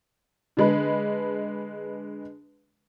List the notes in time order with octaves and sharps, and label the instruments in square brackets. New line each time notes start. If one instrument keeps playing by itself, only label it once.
[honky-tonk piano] D3 G#3 B4